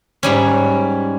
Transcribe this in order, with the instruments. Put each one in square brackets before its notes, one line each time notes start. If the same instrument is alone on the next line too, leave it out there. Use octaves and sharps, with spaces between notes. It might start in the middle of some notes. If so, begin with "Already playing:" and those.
[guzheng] G#2 G3 C#4